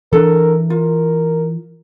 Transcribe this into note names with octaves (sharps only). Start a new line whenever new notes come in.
E3 D4 A4 A#4
F4 A#4